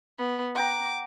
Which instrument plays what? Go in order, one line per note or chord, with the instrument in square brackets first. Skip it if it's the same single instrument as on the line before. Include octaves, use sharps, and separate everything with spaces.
[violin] B3
[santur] F#5 G5 A#5 [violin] D6